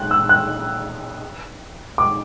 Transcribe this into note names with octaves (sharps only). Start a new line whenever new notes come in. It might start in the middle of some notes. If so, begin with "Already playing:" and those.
Already playing: F#6
E6
F#6
D6